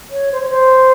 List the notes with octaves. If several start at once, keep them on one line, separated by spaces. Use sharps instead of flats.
C#5
C5
C#5
C5